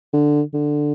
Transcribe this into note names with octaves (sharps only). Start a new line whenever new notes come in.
D3
D3